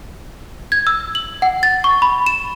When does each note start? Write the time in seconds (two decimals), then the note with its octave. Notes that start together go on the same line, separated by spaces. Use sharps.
0.72 G#6
0.87 E6
1.15 F#7
1.42 F#5
1.63 A6
1.84 C#6
2.02 B5
2.26 E7